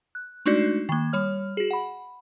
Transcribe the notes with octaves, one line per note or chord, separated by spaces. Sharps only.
F#6
G#3 A3 D4 D#4 F#4 D5
D#3 A#3
G3 C#5 F6
F#4 G#4
F#5 B5